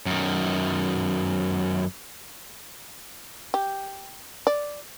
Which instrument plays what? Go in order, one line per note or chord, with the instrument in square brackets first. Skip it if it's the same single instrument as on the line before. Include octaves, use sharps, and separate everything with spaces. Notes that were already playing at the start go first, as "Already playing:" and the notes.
[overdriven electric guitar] F#2 D#3
[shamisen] G4
D5